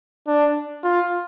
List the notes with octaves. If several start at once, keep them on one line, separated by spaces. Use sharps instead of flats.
D4
F4